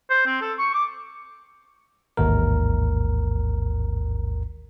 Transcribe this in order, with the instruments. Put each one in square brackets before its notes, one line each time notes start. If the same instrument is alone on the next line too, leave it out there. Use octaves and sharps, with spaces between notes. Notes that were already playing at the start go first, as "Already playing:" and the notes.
[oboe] C5
C4
A4
C#6
D6
[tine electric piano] A1 D#2 G#2 A#4